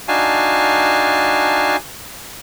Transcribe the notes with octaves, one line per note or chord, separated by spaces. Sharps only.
D4 D#4 F#4 F5 G#5 A5